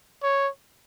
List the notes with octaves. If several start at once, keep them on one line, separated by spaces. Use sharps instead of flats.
C#5